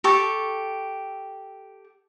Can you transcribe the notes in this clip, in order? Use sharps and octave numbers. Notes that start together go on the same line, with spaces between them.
G4 A4 C#6